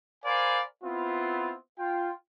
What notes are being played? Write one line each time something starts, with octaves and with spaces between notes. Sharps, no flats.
A#4 C5 D5 F5 G#5 B5
B3 C4 E4 F4
F4 G5